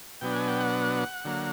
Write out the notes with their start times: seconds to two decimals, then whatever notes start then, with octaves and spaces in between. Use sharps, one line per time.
0.21 B2 F#3 B3 D4 G5
0.35 G#5
0.48 G5
0.60 F#5
1.25 D3 F#3 A#3